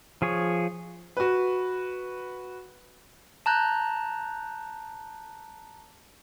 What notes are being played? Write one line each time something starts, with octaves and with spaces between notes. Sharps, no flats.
F3 G#4 C#5
F#4 B4
A5 A#5 F#6 G6